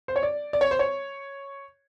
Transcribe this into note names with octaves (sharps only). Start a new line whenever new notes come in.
C5
C#5
D5
D5
C#5
C5
C#5